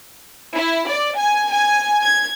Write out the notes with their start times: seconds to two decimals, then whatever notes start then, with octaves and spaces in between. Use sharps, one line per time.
0.55 E4
0.89 D5
1.18 G#5
1.53 G#5
2.04 G#6